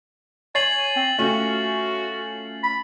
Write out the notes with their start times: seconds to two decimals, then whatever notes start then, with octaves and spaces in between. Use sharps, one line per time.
0.55 C#5 G#5 A6 C7 F#7
0.96 C4
1.18 A3 C#4 F4 F#4
2.63 B5